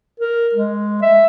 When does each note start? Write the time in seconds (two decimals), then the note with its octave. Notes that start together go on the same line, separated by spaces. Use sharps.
0.20 A#4
0.54 G#3
1.02 E5